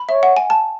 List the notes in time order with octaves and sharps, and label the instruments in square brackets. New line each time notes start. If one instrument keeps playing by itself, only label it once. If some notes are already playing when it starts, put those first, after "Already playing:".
Already playing: [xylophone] B5
[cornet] C#5 [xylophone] E5
[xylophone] F#5
G#5
A5